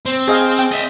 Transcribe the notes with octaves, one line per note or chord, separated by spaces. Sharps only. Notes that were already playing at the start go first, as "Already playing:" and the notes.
C4
G#4 D#5 F5
G5
D#5 E5